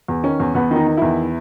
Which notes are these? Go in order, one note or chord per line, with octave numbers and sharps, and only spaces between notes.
E2
D#3 C#4
E2
E2 B3
D#3
D#4
D#3
E2 E4